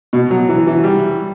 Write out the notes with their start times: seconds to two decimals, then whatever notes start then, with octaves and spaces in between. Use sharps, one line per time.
0.13 B2
0.31 F#3
0.49 E3
0.67 E3
0.84 G3